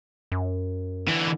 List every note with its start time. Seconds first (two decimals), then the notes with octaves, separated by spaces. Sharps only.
0.32 F#2
1.08 D3 E3